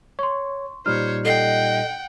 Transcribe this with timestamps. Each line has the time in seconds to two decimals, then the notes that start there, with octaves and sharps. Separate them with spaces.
0.19 C#5 C6 C#6
0.86 A#2 G3 D#4 C5 C#5 F6
1.25 A4 D#5 F#5 G5 C7